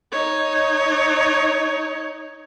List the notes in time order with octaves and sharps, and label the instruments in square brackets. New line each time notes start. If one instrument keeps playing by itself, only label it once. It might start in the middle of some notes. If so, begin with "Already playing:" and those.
[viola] D#4 C#5